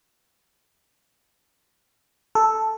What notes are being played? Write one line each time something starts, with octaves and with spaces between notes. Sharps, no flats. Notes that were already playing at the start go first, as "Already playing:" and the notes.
A4